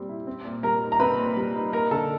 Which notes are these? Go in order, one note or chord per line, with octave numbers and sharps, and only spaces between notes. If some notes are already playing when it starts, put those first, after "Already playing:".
Already playing: A#2 G3 C4
E4
C4
A#2
G3 A#4 A#5
D#4
A#5
C4 B4 B5
A#2
G3
D#4
A#3 A#4 A#5
D3 A4 A5